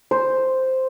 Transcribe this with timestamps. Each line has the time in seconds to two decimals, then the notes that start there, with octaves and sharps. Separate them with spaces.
0.11 C5